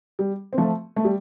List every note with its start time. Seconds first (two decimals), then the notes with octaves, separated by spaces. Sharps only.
0.19 G3
0.53 C4
0.58 F3 A3
0.96 A3
1.05 G3